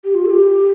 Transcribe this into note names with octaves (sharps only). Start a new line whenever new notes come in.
G4
F4
A4
G4